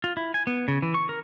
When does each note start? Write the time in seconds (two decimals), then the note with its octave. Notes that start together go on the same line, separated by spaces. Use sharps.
0.04 F4
0.17 E4
0.34 G#5
0.47 B3
0.68 C#3
0.82 E3
0.94 C#6
1.09 A#4